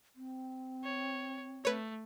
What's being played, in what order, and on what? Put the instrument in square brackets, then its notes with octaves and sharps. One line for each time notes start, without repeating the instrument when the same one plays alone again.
[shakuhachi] C4
[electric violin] C#5
[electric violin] A3 [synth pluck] B4 C#5